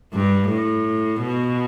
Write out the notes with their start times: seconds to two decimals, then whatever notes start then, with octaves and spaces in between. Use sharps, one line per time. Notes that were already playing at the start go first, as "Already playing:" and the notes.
0.14 G2
0.49 A2
1.21 B2